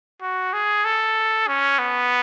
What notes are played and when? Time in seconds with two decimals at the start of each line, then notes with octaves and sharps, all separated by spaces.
0.21 F#4
0.53 G#4
0.85 A4
1.48 C#4
1.79 B3